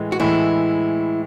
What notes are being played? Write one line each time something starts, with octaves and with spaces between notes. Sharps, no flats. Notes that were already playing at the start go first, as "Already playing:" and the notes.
Already playing: A2 E3 G#3
F#4
A2 E3 G#3 E4